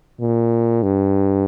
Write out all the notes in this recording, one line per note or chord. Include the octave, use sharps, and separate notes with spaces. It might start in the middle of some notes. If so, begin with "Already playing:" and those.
A#2
G2